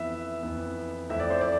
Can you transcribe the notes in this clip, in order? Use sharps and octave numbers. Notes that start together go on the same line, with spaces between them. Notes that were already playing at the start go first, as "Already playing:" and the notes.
Already playing: F2 E3 B3 E5
F2 E3 B3
F2 E3 A3 C4 E5
D5
C5
D5